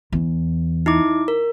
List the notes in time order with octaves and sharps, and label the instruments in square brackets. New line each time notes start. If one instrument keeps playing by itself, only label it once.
[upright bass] E2
[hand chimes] D#4 E4 D6
A#4